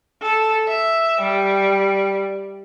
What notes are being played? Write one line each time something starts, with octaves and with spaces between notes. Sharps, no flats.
A4
E5
G3